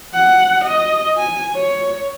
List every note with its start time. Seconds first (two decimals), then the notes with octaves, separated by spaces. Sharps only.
0.14 F#5
0.64 D#5
1.18 G#5
1.55 C#5